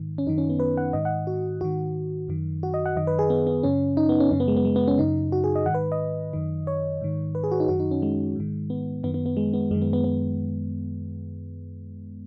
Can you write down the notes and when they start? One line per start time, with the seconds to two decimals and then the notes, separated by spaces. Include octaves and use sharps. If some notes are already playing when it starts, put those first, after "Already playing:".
Already playing: G#2 D#3
0.18 C#4
0.26 F#2 D#3 D#4
0.38 C#4
0.49 B3
0.60 B4
0.77 F#5
0.93 G#2 D#3 D#5
1.05 F#5
1.27 F#4
1.61 G#2 D#3 F#4
2.28 F#2 D#3
2.63 F#4
2.74 D#5
2.86 F#5
2.96 F#2 D#3 D#5
3.07 B4
3.19 G#4
3.30 B3
3.47 B3
3.63 F#2 C#3 C#4
3.97 D#4
4.09 B3
4.20 C#4
4.31 F#2 C#3 C#4
4.40 B3
4.48 G#3
4.56 B3
4.65 G#3
4.76 B3
4.88 C#4
4.98 F#2 C#3 D#4
5.32 F#4
5.44 G#4
5.55 D#5
5.66 G#2 D#3 F#5
5.75 B4
5.92 D#5
6.33 F#2 D#3
6.67 C#5
7.01 G#2 D#3
7.35 B4
7.44 G#4
7.52 F#4
7.60 D#4
7.68 F#2 D#3 F#4
7.80 D#4
7.91 C#4
8.02 G#3
8.36 G#2 D#3
8.70 B3
9.04 F#2 D#3 B3
9.14 B3
9.26 B3
9.37 G#3
9.53 B3
9.71 F#2 D#3 G#3
9.82 B3
9.93 B3
10.04 B3